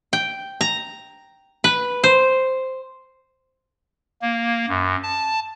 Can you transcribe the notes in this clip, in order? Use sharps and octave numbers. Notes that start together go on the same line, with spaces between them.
G5
A#5
B4
C5
A#3
F#2
A5